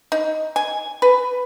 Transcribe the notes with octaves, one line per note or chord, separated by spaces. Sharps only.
D#4
G#5
B4